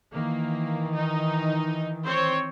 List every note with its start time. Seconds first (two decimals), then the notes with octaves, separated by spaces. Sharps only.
0.13 D#3 E3 A#3
0.94 D#4
2.04 C4 C5 C#5